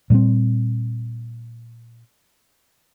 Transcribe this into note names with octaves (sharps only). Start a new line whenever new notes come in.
A#2 G3 A#3 C4